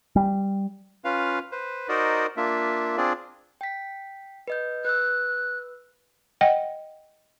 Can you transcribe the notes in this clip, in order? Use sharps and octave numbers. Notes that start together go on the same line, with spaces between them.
G3
C#4 F4 B4 F5
B4 C5
D#4 F#4 A#4 C5 D5 D#5
A#3 D4 F4 E5
C4 D4 F4 G#4 D5
G5 B6
B4 D#5 G6
B4 E6 F#6
D#5 F#5 G5